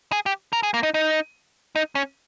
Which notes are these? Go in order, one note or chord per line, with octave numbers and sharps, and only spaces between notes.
G#4
G4
A#4
G#4
A#3
D#4
D#4
D#4
C#4